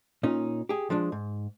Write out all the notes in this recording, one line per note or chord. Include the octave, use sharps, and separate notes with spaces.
A#2 C#4 D#4
G4 G#4
F3 G#3 D4
G#2